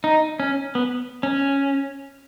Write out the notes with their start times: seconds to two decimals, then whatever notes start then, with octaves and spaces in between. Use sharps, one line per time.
0.04 D#4
0.40 C#4
0.75 B3
1.23 C#4